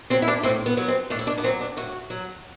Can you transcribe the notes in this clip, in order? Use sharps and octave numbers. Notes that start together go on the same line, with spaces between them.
F#3 C4
E4
D4
A2 C4
B3
F#3 B3
C4
A2 D4
E4
D4
B3
F#3 C4
D4
A2 F#4
F#3